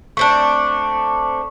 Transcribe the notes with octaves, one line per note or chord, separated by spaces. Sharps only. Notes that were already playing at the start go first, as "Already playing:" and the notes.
A3 C4 D4 C#6